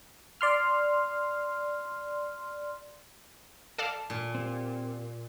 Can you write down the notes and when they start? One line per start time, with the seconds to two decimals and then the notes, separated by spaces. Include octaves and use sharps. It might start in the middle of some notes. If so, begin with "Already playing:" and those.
0.41 D5 C6 F6
3.78 A4 D5 F5 A5
4.10 A#2
4.35 C4 G4